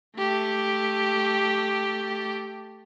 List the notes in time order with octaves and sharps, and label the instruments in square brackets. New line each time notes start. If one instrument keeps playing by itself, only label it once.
[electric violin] A3 G4